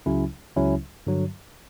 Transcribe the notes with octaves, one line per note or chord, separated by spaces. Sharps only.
C#2 C#3 F#3 C#4 E4
C#2 C#3 F#3 C#4 E4
G2 D3 F#3